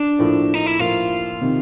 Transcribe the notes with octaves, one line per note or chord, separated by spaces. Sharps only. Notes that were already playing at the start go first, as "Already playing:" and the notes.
Already playing: D4
A2 F3 A#3
D#4
E4
A2 F3 A#3 F4
C3 D#3